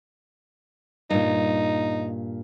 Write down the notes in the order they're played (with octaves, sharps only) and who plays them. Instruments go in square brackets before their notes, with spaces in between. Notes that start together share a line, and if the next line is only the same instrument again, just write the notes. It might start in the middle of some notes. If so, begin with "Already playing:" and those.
[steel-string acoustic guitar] G2 A#2 [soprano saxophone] D#4